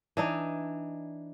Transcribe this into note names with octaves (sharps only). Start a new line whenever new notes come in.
E3 D4 D#4